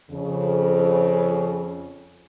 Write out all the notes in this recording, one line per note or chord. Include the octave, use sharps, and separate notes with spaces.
F2 C#3